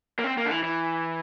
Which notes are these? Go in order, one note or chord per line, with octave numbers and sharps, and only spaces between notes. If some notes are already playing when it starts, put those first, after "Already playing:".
A#3
C4
A#3
D3
E3
E3